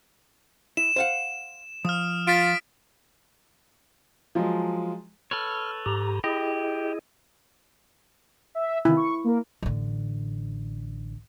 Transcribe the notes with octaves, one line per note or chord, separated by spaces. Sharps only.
E4 E7
C5 F5 F#5
F3 D#6 F6
F4 A6 B6 D7
F3 F#3 G#3
A4 B4 C#5 F6
G#2 G4 A#5
E4 G4 G#4 D#5
E5
C3 D#3 E4 F4
C#6
A#3 A#4
A1 D3